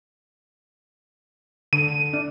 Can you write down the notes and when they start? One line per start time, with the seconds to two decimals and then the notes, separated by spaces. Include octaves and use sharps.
1.73 D3 D#7
2.13 D4